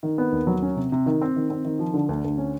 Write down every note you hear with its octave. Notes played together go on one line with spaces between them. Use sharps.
D#3
B3
D#2
F#3
C#4
C3
C3
D#3
C4
D#3
C4
D#3
F3
D3
D2
D2
C#4